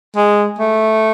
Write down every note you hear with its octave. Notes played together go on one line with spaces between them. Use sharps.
G#3
A3